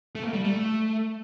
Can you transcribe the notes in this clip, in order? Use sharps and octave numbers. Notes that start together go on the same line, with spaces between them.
A3
A#3
G3
A3